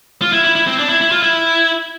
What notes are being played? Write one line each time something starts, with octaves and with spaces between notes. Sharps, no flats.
F4
E4
E4
E4
C4
D4
E4
E4
F4
E4